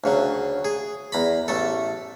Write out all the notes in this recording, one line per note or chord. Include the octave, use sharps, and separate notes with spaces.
D2 C#3 F#3
G#4
E2 A#5 B5
A1 A3 A4